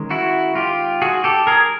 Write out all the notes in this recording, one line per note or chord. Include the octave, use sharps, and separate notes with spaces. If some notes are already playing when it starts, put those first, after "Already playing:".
Already playing: D#3 G#3 C#4
E4 F#4
F4 G4
F#4 G#4
G4 A4
G#4 A#4